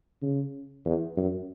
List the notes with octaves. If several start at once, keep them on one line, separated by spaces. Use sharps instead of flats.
C#3
E2
F#2